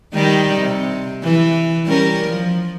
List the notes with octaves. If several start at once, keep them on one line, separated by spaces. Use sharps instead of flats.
D#3 G3 D#4
C3
E3
G3 C#4 A#4
F3